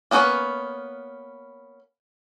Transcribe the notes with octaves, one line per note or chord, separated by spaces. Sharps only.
A#3 B3 C#4 F#4 B4